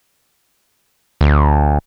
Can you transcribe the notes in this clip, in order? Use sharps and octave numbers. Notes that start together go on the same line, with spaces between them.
D2